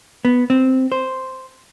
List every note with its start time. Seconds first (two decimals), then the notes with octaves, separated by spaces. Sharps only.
0.25 B3
0.50 C4
0.92 C5